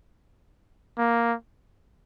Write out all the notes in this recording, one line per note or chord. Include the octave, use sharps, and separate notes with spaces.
A#3